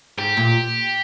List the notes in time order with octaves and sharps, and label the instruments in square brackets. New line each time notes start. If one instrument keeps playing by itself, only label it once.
[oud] G#2 [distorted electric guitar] G4
[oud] A#2